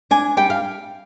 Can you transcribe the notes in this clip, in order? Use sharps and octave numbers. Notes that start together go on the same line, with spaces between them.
D4 G#5
G3 G5
F5